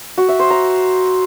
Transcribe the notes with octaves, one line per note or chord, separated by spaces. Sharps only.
F#4
E5
C5
A#5